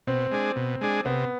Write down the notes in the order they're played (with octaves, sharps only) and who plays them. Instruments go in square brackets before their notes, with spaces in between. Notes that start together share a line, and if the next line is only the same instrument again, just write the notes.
[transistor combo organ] B2 [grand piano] C4
[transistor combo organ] G#3 D4 G#4
B2
G#3 D4 G#4
[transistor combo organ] C3 [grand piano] B3